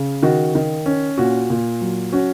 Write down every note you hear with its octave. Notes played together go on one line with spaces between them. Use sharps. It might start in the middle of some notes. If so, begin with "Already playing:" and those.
Already playing: C#3
D#3 F#4
D#3
C#4
A#2 F#4
A#2
F#3
C#4 F#4